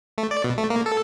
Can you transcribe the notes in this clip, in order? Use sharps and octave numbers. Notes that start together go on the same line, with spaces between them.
A3
D5
B2
A3
A#3
A4